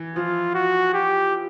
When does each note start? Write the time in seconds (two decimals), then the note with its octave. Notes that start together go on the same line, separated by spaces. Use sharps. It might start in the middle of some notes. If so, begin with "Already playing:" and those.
Already playing: E3
0.16 F3 F4
0.54 F#4
0.94 G4